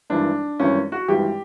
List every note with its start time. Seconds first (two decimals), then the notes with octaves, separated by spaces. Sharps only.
0.10 G#1 G2 E3 D4
0.59 G#1 G2 E3 C#4
0.92 F#4
1.08 G#1 G2 E3 G4